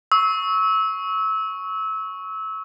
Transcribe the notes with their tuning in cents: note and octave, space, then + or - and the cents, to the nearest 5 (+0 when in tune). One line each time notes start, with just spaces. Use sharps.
C#6 +0 E6 -25